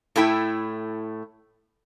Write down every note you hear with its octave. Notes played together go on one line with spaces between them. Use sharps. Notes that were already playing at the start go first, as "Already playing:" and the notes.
A2 A3 E4 G5